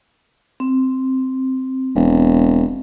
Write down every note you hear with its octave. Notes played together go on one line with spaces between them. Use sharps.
C4
E1